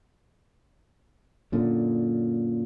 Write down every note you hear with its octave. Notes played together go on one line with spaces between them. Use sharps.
F#2 A#2 D3